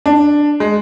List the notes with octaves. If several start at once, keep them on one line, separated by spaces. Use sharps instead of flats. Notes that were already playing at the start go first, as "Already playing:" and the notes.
D4
G#3